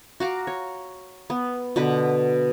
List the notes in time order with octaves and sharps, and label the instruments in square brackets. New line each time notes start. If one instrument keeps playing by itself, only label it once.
[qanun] F#4 F5 A#5 D6
C#5
B3
B2 D3 B4